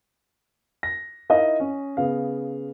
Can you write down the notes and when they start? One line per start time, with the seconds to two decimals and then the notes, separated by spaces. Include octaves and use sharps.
0.83 A#6
1.30 D#4 E4 A#4 D#5 F5 D#6
1.60 C#4
1.97 C#3 B3 F5